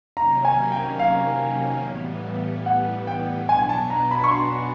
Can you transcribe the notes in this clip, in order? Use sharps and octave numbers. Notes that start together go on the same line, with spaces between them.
C3 D#3 F#3 A#3 C#4 A#5
G#5
G5
F5
A2 E3 G3 B3
F#5
G5
B2 F#3 B3 D4 G#5
G#5
A5
A#5
B5
C#6
C6